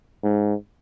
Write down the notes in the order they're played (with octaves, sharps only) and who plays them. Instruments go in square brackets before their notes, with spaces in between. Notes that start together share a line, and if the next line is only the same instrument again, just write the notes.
[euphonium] G#2